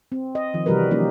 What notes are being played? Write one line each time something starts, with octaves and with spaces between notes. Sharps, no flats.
C4
D#5
D#3 F3
C3 E3 G3 F#4 A#4 B4
F3 F#3 A#3 C#4 D#4 G4